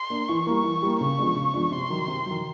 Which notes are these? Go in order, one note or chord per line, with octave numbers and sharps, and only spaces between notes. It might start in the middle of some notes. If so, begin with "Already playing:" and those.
Already playing: C6
A#3 D4
E3 C#6
G3 A#3
E3
G3 A#3
C#3 C#6
F3 G#3 B3 D4
C#3
F3 G#3 B3 D4
C3 C6
D#3 F#3
C3
D#3 F#3